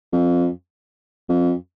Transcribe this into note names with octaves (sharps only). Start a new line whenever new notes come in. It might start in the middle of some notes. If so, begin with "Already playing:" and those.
F2
F2